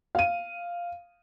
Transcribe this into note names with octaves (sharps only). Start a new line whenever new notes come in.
F5 D#7